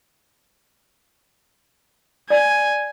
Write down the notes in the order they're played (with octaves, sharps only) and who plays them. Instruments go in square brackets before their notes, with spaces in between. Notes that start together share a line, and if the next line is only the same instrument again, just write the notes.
[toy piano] D5 [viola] G#5